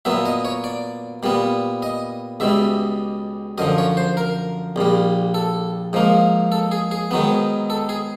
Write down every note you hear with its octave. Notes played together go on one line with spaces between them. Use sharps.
A#2 F#3 B3 E5
D#5
C#5
D5
A#2 G3 B3
D#5
C#2 B2 G3 E5
F#2 D3 F3 D#5
C#5
C5
A#4
A#1 A#2 G3
A4
G#2 F3 A#3
A4
G#4
G#4
G#2 D#3 F#3 B3
A4
G#4